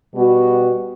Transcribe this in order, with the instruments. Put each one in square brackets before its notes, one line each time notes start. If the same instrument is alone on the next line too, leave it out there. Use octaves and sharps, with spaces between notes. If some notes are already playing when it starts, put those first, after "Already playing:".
[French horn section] B2 G3 B3 F#4